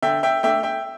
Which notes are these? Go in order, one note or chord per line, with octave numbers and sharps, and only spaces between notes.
D3 E5 G5
E5 G5
A3 D4 E5 G5
E5 G5